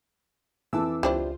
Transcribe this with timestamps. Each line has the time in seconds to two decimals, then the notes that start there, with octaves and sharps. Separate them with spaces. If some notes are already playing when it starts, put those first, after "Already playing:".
0.73 F2 E3 A5 D6 E6
1.03 C#2 G3 D4 E4 F4 C5